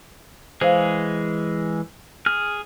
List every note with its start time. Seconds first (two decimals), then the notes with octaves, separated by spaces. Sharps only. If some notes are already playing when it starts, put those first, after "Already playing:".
0.61 E3 G#3 G#4 C5 F5
2.26 G#4 F6